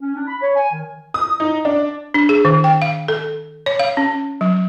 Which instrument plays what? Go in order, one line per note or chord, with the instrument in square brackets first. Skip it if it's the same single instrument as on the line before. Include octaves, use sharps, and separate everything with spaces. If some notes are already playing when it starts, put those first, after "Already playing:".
[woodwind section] C#4
D4
B5
C#5
G#5
D#3
[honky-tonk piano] D#6
D#4
D4
[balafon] D4
G#4
D#3
G5
F5
A4
C#5
F5
C#4
F#3